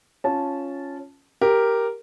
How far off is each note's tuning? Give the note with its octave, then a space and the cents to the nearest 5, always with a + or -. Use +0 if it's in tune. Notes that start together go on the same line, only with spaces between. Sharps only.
C#4 +0 F4 +0 A5 -10
G4 +0 A#4 +0